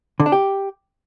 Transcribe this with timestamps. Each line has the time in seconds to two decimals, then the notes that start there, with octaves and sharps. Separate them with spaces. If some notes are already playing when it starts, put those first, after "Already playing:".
0.20 D3
0.26 D4
0.32 G4